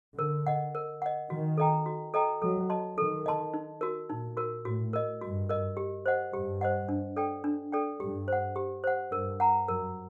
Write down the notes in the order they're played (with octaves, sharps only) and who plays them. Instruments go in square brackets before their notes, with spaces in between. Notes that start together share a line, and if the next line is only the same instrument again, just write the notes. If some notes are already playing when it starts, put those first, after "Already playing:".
[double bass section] D3 [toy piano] A#4
[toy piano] D#5 F#5
A#4
D#5 F#5
[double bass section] D#3 [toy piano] F#4
[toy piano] A4 D#5 G5 A#5
F#4
A4 D#5 G5 A#5
[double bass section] F#3 [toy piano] A4
[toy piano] D#5 A5 C6
[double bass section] D#3 [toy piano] A4
[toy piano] D#5 A5 C6
D#4
F#4 A#4
[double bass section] A#2 [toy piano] D#4
[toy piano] F#4 A#4
[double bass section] A2 [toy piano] F#4
[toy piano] A#4 D#5
[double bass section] G2 [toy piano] F#4
[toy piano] A#4 D#5
G4
C5 D#5 F#5
[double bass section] G2 [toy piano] G4
[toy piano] C5 D#5 F#5
D4
A4 D5 G5
D4
A4 D5 G5
[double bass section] G2 [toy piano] G4
[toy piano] C5 F#5
G4
C5 F#5
[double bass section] G2 [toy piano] A#4
[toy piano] F#5 A#5
[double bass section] F#2 [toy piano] A#4